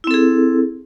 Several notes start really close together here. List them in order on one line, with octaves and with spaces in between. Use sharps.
E4 C4 A4 G#4